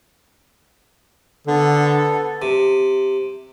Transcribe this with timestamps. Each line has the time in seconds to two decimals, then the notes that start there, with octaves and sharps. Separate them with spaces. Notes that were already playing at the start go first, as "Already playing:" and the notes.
1.47 D3 B3 A4
2.42 C3